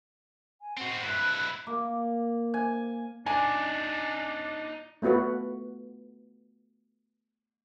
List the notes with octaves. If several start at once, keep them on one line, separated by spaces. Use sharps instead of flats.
G#5
C4 F#4 F#5
G2 E4 F#6
A#3
G#5
D4 D#4 D5 G#5
A3 B3 F4 F#4 B4